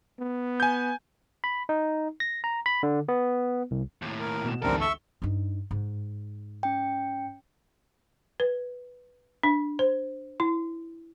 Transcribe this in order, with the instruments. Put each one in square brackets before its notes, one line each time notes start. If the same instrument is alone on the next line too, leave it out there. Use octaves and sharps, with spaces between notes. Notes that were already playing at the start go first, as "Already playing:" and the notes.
[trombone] B3
[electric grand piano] G#5 G6
[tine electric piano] B5
D#4
A#6
A#5
B5
D3
B3
C2
[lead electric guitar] D#2 A2
[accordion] A#4
[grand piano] B2 E7
[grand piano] A1 D2 G#2 [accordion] G3 C4 A#4 [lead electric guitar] B3 A4
[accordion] E5 C#6 E6 [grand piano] G7
[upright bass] G2 D#4
G#2
[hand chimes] C#4 G5
[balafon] B4
D4
C5
E4